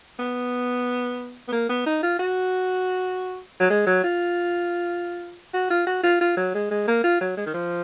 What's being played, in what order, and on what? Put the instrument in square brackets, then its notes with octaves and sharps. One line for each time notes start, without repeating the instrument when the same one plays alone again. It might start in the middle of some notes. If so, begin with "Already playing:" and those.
[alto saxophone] B3
B3
A#3
B3
D#4
F4
F#4
F#3
G#3
F#3
F4
F#4
F4
F#4
F4
F4
F#3
G#3
G#3
A#3
F4
F#3
G#3
D#3
F3